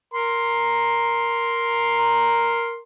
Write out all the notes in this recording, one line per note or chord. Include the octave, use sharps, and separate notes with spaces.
A#4 A#5 C6